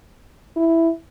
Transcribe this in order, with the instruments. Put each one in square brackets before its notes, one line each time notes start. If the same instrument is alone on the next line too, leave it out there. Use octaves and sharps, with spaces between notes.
[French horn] E4